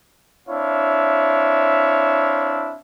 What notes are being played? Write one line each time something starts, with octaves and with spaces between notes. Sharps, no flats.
C4 D4 E4 C#5 E5 F5